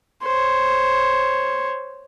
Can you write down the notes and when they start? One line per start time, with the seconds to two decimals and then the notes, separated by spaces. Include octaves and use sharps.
0.23 C5 C#5